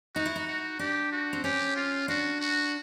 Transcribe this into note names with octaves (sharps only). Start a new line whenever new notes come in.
D#4 F#4
E4
D#4
F#4
D4 G4
F#4
C4
C#4 G4
F4
D4 F#4
F#4